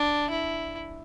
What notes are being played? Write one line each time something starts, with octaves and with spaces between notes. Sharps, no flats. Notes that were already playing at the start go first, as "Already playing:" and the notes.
Already playing: D4
E4